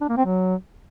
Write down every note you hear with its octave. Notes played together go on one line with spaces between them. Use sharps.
D4
A#3
C4
F#3